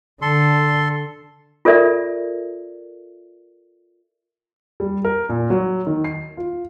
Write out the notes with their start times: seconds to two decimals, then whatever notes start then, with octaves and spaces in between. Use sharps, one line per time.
0.22 D3 A4 C6
1.65 F4 A4 A#4 D5 E5
4.80 G3
5.05 A#4
5.29 A#2
5.50 F#3
5.87 D#3
6.04 C7
6.37 F4